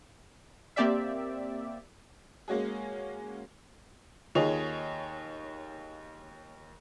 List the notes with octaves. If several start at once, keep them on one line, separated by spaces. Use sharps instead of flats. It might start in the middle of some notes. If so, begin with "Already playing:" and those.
A#3 C4 G4 D5 E5
G#3 A#3 C#4 F#4 G#4
D#2 F4 G#4 C#5 D#5 F7